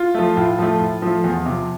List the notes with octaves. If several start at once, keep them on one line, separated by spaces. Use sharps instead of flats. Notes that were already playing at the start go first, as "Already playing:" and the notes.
Already playing: F4
F3 A3
A2 F4
F3 A3
A2
F3 A3
E2
C3 F3